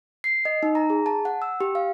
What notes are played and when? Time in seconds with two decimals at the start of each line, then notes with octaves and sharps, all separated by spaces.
0.24 C7
0.45 D#5
0.63 D#4
0.75 A#5
0.90 G#4
1.06 A5
1.25 F#5
1.42 E6
1.61 G4
1.75 F5